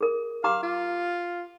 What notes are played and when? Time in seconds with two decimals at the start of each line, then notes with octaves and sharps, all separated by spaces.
0.01 G#4 A#4
0.44 G4 F5 A#5 D6
0.63 F4